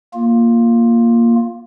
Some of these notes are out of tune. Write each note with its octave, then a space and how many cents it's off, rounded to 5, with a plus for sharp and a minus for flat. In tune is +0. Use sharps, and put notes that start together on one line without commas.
A#3 +0 F4 +10